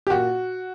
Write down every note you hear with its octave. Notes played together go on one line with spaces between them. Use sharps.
G4
A#2 F#4